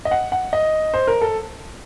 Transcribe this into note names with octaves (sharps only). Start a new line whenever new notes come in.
D#5
F#5
F#5
D#5
C5
A#4
A4